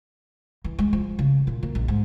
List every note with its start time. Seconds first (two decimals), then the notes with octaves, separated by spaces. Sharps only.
0.64 E3
0.79 G#3
0.93 F3
1.19 C#3
1.47 A#2
1.63 A#3
1.75 A#1
1.88 G#2